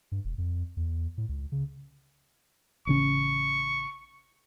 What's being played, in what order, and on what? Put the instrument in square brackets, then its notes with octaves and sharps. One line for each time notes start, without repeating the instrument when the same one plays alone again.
[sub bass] G2
E1
F2
E2
A2
C#2
C#3
[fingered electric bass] A1 C#3 C#4 [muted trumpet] C#6